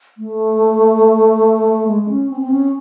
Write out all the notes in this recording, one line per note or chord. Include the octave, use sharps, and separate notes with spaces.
A3
G#3
C#4
C4
C4
C#4